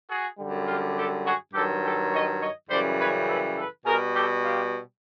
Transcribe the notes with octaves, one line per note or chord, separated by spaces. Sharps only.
F#4 G#4
F#2 D3 G3
F4 G4
G4 A4
F#4 G#4
G2 D#3 F#3 G4 A4
G4 A4
C#5 D#5
C#5 D#5
F#2 C#3 E3 G3 C5 D5
B4 C#5
A4 B4
A4 B4
B2 G3 G#4 A#4
G4 A4
F4 G4